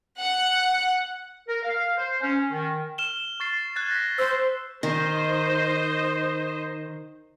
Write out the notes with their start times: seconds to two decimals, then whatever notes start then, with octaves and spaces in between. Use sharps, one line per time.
0.19 F#5
1.48 A#4
1.62 F5
1.97 C5
2.22 C#4
2.50 D#3
2.98 F6 E7 G7
3.40 C#6 A6 C7
3.76 F#6 G#6 A6
3.91 A#6 B6
4.19 C5 E6 C7
4.83 D#3 C5 D#5